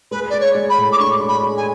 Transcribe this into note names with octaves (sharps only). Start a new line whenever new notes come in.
G#3 B4
G#3 D5
C#5
G#3
B5
A2
D6
D4 C#6
G#3
B5
G#3
G#5